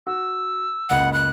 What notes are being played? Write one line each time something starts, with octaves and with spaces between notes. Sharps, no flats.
F#4 E6
F#1 C#2 F#5
F#6